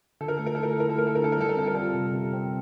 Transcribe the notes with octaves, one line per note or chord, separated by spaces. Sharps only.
D3 A4
A#4
A3 A4
A#4
A4
E4 A#4
A4
E4 A#4
A4
A3 A#4
A4
D3 A#4
A4
A#4
G3 A4
A#4
C4 A4
A#4
G3 F4 A4
C3
C3
C4